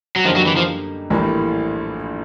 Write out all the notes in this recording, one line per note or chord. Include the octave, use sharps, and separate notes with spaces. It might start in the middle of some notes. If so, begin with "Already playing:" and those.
F#3
F#2 D3 F3 G3 A#3 D#4
F#3
E3
F3
A#1 A2 E3 G3 A#3